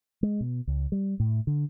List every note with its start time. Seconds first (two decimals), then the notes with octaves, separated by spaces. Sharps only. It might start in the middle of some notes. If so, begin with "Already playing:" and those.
0.23 G#3
0.40 B2
0.67 C#2
0.92 G3
1.20 A2
1.47 D3